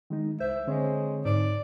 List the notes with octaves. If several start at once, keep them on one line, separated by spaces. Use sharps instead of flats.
D#3 G#3 D#4
C2 C5 E5
D3 G#3 C4 C#5
G#2 D5